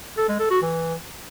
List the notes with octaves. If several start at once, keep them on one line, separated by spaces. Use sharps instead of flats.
A4
G#3
A4
F#4
E3